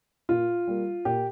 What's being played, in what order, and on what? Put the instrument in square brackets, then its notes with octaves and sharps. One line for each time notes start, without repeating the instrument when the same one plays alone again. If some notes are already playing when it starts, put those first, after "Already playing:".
[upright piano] A#2 F4
G3 A#3
A#2 G4